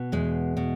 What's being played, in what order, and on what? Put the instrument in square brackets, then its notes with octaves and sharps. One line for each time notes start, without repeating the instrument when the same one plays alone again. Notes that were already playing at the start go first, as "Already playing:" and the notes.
Already playing: [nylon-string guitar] B2
E2 G#3
B2